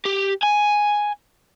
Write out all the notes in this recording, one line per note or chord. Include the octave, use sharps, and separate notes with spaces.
G4
G#5